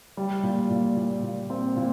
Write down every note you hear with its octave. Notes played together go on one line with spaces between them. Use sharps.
G3
A#2
A#2
A#2
A#2
C4
A#2